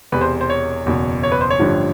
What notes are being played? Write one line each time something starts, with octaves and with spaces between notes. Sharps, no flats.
E1 E2 C3 B4
C5
C5
C#5
F#1 E2 B2
C#5
B4
C5
C#5
A1 G2 D3 F3